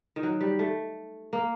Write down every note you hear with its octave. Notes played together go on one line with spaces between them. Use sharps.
D#3
F#3
G3
A3
A#3